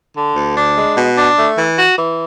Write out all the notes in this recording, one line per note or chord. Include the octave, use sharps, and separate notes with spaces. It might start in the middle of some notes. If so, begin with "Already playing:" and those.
D3
D2
D4
G#3
B2
D4
A3
E3
F#4
E3